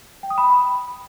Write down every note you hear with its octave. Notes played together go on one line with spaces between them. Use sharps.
G5
D#6
B5